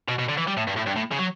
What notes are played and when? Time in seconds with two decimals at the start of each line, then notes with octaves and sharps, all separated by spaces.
0.09 B2
0.19 B2
0.29 D3
0.38 E3
0.48 G3
0.57 A2
0.68 G2
0.76 A2
0.87 G2
0.96 A2
1.12 C#3
1.19 F#3